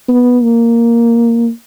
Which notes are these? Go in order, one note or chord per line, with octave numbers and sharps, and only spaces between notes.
B3
A#3